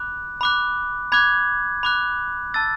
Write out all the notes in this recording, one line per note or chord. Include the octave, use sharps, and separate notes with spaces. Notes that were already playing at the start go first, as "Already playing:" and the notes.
Already playing: B5 D6 F#6
B5 D6 F#6
B5 D6 F#6 G#6
B5 D6 F#6
A5 E6 A6